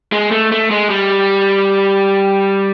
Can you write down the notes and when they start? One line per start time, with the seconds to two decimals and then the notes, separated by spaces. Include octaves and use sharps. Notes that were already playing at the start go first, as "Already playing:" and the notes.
0.12 G#3
0.31 A3
0.52 A3
0.71 G#3
0.90 G3